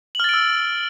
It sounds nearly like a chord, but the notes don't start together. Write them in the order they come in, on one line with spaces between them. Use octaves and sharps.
F#7 F6 A6 D7 E6